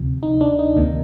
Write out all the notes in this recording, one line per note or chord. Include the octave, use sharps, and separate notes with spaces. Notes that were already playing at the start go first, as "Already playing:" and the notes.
Already playing: D2 C3 F3
D#4
D4
D#4
D2 C3 D#3 A#3